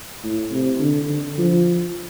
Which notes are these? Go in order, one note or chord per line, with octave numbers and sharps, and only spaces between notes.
A2
C3
D3
D3
F3